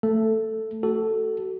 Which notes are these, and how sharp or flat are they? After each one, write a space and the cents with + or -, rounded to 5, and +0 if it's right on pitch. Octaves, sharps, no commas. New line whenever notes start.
A3 +15 A4 +0
F#4 +35 A4 +0